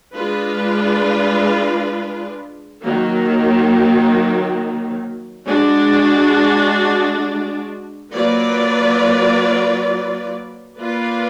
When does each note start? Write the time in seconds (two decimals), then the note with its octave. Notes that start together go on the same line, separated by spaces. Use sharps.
0.14 G#3 D4 F4 B4
2.80 D#3 F#3 A#3
5.46 G#3 D4 F#4
8.13 F#3 A#3 F4 B4 D5
10.78 A#3 F4 B4 D5